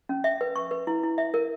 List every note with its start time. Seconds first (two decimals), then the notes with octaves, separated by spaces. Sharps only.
0.09 C#4
0.24 E5
0.41 B4
0.56 C#6
0.71 B4
0.87 E4
1.03 E4
1.18 E5
1.34 A#4